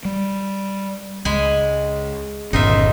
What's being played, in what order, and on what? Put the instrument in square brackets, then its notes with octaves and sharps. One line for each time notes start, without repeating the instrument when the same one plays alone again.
[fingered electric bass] G3
[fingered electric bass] C#2 [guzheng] G#3 G#5 B5
[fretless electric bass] G1 [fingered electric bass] D#2 A#2 C#4 [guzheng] D#4 F4 E5